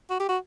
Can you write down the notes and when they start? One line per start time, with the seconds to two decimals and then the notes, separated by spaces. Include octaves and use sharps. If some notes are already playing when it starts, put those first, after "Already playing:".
0.10 F#4
0.20 G4
0.29 F#4